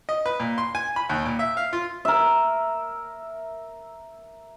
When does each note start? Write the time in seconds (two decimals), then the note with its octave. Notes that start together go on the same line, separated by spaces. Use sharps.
0.09 D#5
0.26 B4
0.40 A#2
0.58 C6
0.75 G#5
0.96 B5
1.09 D#2
1.26 A#2
1.39 E5
1.57 F5
1.73 F4
2.05 A#4 E5